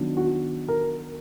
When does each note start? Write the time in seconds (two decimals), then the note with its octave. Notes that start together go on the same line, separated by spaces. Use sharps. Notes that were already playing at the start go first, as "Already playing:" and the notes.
Already playing: D#3 F#3 B3 D4
0.17 F#4
0.68 A#4